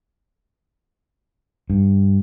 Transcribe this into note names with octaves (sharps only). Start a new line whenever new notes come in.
G2